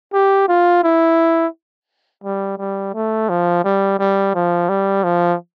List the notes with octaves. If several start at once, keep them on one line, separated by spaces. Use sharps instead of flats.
G4
F4
E4
G3
G3
A3
F3
G3
G3
F3
G3
F3